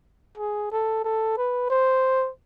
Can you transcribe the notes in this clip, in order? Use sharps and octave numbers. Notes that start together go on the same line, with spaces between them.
G#4
A4
A4
B4
C5